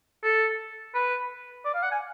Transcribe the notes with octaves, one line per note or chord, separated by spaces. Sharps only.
A4
B4
D5
F5
F#5
G#5